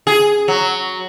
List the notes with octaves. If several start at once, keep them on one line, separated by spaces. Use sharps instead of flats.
G#4
F#3